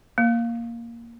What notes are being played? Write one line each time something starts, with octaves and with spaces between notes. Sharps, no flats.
A#3